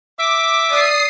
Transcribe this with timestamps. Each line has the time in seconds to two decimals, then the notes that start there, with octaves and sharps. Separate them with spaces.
0.19 E5 D6
0.70 D5 D#6 C7